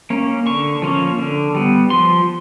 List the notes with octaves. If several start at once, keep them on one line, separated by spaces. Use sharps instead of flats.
A#3 C#4
D3 C#6
F3 A#3 C#4
D3
G3 B3
F3 C6